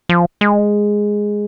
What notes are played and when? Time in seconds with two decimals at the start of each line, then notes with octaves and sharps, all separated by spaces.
0.09 F3
0.41 G#3